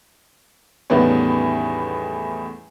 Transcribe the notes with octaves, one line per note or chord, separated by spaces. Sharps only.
E2 A2 D#3 G3 B3 C#4